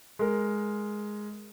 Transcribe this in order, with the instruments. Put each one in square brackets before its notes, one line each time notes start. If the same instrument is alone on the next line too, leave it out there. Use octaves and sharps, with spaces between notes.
[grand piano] G#3 A#4